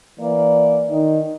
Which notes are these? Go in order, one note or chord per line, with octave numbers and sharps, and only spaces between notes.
E3 A#3 D5
D#3 D#4